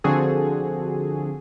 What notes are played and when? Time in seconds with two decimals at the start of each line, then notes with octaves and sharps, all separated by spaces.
0.04 D3 F3 C4 F#4 G#4 A4